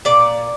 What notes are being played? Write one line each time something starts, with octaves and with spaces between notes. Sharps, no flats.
A#2 D5